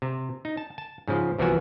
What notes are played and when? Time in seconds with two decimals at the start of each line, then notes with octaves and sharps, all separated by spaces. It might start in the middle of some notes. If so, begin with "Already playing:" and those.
0.02 C3
0.45 D#4
0.57 A5
0.78 A5
1.08 G#2 C#3 F3
1.38 C2 E3 F3 B3 F#4 G#5